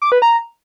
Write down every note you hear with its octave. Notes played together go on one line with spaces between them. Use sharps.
D6
B4
A#5